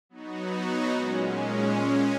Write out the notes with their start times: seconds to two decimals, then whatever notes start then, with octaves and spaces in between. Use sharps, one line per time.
0.09 F#3 B3 D#4 F#4
0.89 A#2 G#3 C#4